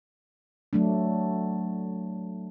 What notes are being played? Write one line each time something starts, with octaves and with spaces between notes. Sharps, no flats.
F#3 A3 D4